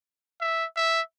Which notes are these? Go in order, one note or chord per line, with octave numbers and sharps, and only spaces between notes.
E5
E5